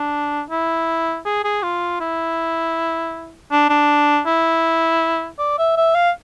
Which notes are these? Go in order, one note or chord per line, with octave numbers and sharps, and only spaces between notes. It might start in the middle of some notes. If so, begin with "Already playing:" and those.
Already playing: D4
E4
G#4
G#4
F4
E4
D4
D4
E4
D5
E5
E5
F5